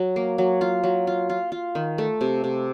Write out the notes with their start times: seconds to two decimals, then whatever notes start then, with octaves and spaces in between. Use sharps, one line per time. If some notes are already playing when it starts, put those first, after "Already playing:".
Already playing: F#3
0.16 A#3
0.38 F#3
0.61 F4
0.83 F#3
1.07 F4
1.30 F4
1.52 F4
1.75 D#3
1.98 A3
2.21 C3
2.44 C3